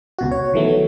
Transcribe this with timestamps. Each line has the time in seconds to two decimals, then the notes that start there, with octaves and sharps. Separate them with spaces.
0.19 C#2 B2 F#4
0.32 C#5
0.54 D#3 E3 F#3 A3 B3